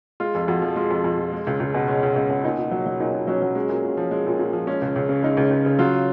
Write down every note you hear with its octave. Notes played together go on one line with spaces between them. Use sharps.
G#3 F4
F2
F2 F#4
F3
G#3 F4
F2
F2
F3
G#3
C#2
C#2
B2
G#3 C#4
C#2
C#2
B2
A#2 D#4
A#2
F#3
F#3
A#2 D#4
A#2
F#3 C#4
F#3
G#3 C#4
A#2
A#2
F3
G#3
A#2
A#2
F3
G#3 C#4
C#2
C#2
C#3
G#3 D#4
C#2
C#2
C#3
F#3 F4